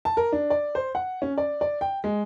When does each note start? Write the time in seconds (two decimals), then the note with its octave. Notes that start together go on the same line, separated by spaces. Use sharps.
0.05 A5
0.17 A#4
0.32 D4
0.50 D5
0.75 C5
0.95 F#5
1.22 C#4
1.38 D5
1.61 D5
1.81 G5
2.04 G#3